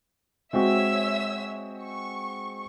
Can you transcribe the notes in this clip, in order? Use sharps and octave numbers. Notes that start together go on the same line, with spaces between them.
G#3 C4 F#4 C#5 E5 E6
C#6